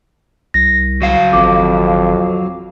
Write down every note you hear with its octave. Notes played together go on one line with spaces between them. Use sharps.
C2 A#6
F#3 F5
G#1 F2 D6